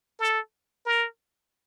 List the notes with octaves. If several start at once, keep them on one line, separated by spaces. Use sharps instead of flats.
A4
A#4